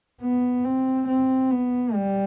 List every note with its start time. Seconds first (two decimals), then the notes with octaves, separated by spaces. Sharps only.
0.21 B3
0.64 C4
1.08 C4
1.51 B3
1.94 G3